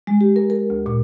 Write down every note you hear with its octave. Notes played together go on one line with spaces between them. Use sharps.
G#3
G4
A#4
A#4
D2
A#2